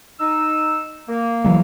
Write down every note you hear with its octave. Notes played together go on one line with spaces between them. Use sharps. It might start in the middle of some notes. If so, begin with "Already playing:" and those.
D#4 E6
A#3
E3 F#3 G#3